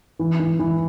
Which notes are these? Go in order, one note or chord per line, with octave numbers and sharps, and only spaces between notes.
E3
E3
E3